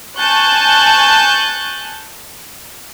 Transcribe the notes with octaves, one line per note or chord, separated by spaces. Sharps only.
G#5 A5 C#6 F#6 G6